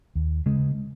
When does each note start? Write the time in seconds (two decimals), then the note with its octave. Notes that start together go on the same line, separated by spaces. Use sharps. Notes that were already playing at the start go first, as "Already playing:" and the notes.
0.15 D#2
0.46 C#3 G#3